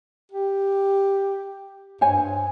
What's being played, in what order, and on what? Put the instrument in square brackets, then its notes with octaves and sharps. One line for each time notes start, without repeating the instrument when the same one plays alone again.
[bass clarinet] G4
[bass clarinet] G2 [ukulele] C5 C#5 G#5